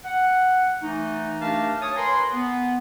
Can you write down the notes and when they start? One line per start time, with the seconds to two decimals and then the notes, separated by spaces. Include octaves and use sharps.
0.05 F#5
0.82 E3 A3 D#4
1.40 A3 D4 G4 A#4 F5 A5
1.81 C#5 A5 D#6
1.96 A#4 B4 G#5 A#5 C6
2.33 B3